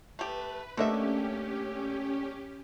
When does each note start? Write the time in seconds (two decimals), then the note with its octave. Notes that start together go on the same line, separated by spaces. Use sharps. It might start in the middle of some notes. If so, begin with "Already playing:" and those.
0.19 A3 G4 B4
0.77 D3 A3 A#3 C#4 D4 G4 D#5 E5